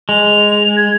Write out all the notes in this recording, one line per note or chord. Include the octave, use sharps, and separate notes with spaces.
G#3 F7
G#6